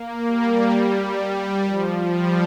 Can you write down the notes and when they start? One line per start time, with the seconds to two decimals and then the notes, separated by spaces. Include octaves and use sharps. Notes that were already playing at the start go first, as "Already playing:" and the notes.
Already playing: A#3
0.26 G3
1.66 F3
2.14 G3